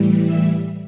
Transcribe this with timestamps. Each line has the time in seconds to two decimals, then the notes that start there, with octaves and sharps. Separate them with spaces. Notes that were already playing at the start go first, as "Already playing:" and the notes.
Already playing: A2 E3 G3
0.24 E5